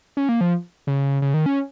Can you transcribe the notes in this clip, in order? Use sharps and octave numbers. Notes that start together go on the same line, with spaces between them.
C#4
A#3
F3
C#3
C#3
D#3
C#4